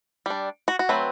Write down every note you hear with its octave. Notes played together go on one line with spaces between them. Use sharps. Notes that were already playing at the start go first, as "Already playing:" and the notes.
G3 D4
F#4
F#4
F#3 A3 C4 B4